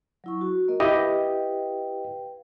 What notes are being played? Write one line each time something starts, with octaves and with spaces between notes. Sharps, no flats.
F#3 E4 C#6
F#4
A#3 A#4 D#5
E4 G4 B4 D#5 F5 G5